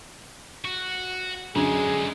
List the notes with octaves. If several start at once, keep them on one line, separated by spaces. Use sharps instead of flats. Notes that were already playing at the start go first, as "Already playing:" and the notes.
F#4
F#2 D3 G#3 D4 G#4